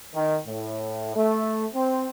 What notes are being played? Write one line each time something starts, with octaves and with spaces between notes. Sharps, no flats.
D#3
A2
A3
C4